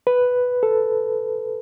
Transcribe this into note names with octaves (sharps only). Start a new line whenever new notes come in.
B4
A4